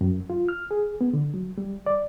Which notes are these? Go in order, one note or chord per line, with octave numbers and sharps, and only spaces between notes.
F#2
F4
F6
G#4
B3
D3
F#3
G3
D5